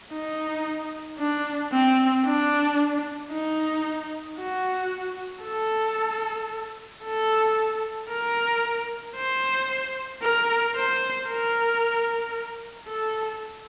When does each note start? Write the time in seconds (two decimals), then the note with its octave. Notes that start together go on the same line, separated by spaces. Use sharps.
0.12 D#4
1.19 D4
1.72 C4
2.26 D4
3.31 D#4
4.39 F#4
5.45 A4
7.04 A4
8.09 A#4
9.16 C5
10.22 A#4
10.76 C5
11.29 A#4
12.88 A4